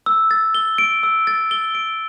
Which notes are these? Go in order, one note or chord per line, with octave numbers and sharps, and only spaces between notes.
E6
A6
G7
D7
E6
A6
G7
D7